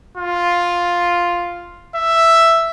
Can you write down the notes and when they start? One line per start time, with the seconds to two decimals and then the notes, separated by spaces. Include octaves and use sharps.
0.18 F4
1.95 E5